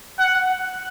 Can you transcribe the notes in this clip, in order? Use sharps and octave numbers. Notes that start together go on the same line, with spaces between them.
F#5